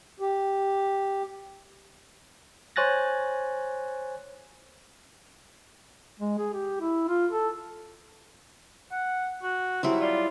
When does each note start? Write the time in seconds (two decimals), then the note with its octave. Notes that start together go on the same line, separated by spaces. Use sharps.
0.20 G4
2.76 C5 C#5 G#5 F#6 A6 A#6
6.20 G#3
6.38 G#4
6.53 G4
6.80 E4
7.08 F4
7.31 A4
8.91 F#5
9.43 F#4
9.83 F#3 G3 C4 E4
10.01 F4 D5